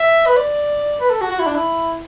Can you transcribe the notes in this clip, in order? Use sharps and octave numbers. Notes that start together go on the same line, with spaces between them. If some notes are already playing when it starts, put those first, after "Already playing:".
Already playing: E5
B4
D5
B4
A4
F#4
F#4
E4
D4
E4